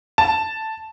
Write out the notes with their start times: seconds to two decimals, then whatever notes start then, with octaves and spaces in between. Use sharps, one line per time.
0.18 A5